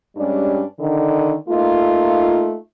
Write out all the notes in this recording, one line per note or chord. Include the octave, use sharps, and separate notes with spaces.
G2 G3 G#3 C#4 D4
D3 D#3
A3 A#3 D#4 F4